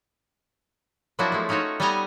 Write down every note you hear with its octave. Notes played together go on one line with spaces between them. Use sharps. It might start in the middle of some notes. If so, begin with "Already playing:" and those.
F3 F#3 A#3 D4 E4 F#4
G#3 A3
C#4 D#4 F4 F#4 C#5
G3 B3 A4 D#5 G#5 A#5